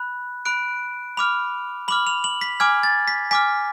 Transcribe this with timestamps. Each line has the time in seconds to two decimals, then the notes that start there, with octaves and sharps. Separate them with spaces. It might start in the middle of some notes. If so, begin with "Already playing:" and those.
Already playing: B5 F#6
0.45 B5 F#6 D7
1.17 B5 D6 F6 F7
1.88 B5 D6 F6 F#7
2.07 F7
2.24 F#7
2.41 B6
2.60 G#5 D6 F6 G#6
2.83 A6
3.08 B6
3.31 G#5 D6 F6 B6